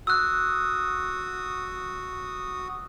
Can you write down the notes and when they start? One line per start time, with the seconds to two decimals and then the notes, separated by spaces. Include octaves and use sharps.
0.07 F#4 D#6 E6 F#6